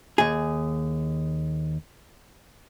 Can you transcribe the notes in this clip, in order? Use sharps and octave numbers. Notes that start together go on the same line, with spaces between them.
D#2 G#4